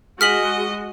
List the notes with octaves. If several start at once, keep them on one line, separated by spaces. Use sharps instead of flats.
G#3 F#4 G#4 D#5 F6 B6 F#7